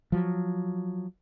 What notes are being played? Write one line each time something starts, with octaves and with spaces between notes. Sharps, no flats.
F3 F#3